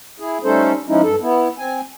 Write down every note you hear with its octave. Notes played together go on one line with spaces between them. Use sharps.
E4 G#4
G3 A3 C#4 D#4 A4 C5
F3 G#3 C#4 D#4 E4
G2 A4
B3 E4
C4 G#5